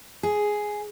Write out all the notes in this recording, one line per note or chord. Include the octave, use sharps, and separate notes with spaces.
G#4